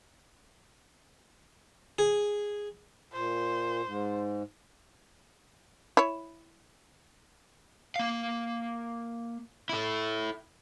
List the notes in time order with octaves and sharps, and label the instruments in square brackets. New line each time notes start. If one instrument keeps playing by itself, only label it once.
[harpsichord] G#4
[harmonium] A#2 [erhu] C5
[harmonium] G#2
[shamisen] E4 C#5
[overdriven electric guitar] A#3 F5
E4 A4